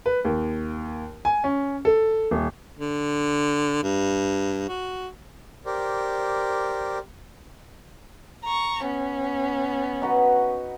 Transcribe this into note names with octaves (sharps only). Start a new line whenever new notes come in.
B4
D#2
G#5
C#4
A4
D#1
D3
G2
F#4
G4 A#4 C5 D5
A#5 C#6
B3 C#4
D#4 F#4 B4